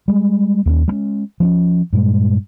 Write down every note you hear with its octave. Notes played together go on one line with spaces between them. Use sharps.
G3 G#3
D#2 A#3 C#4
G3 G#3 C#4
F3 C4 C#4
G2 A#2 G#3